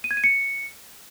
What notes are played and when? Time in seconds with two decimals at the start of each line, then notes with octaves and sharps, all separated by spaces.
0.04 D#7
0.11 G#6
0.17 D#7
0.24 C#7